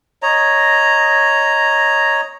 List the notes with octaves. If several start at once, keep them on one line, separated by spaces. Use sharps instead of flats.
C#5 D#5 A#5